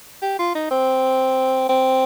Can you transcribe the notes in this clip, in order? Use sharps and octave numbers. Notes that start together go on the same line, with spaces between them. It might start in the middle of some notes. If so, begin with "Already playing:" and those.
G4
F4
D#4
C4
C4